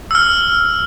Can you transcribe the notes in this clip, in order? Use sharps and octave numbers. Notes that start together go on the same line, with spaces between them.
E6 F6